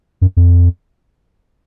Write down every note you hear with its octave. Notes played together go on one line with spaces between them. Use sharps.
F#2
F2